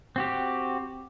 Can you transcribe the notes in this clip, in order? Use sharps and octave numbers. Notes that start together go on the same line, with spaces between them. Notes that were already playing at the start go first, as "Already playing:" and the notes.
C4 F#4 G4